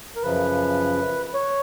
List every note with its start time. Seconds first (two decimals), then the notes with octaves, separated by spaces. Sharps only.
0.16 A#4
0.23 F#2 C#3 F3 B4
1.34 C#5